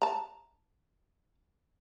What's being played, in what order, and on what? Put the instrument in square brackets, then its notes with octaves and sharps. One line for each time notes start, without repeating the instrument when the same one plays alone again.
[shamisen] A5 A#5